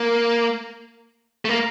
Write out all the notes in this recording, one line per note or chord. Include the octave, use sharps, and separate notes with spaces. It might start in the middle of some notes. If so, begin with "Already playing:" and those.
Already playing: A#3
A3
A#3